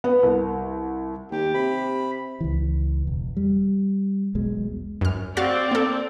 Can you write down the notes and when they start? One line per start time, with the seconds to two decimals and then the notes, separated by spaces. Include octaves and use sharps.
0.04 B3
0.23 C2
1.31 D#2 G4
1.54 C3 B5
2.41 C#2 E3
3.07 E1
3.37 G3
4.35 E1 B1 B2 G#3
5.01 F#2 F6
5.37 C4 F#4 D5 F5 A6
5.71 A#3 A4